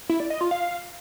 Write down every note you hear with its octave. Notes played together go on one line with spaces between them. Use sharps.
E4
D5
D#5
F4
F5